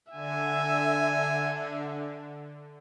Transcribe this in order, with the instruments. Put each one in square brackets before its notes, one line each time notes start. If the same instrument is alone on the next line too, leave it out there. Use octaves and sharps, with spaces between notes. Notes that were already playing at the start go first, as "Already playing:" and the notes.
[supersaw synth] D3 [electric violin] E5 [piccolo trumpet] G#5